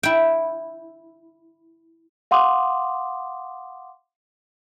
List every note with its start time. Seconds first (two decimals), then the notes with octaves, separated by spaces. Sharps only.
0.03 E4 G5
2.31 F5 F#5 C6 D6 D#6